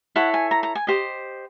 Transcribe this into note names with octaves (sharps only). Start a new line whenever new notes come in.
E4 A4 C#5 F#5
G#5
A#5
A#5
G#5
G4 C5 D#5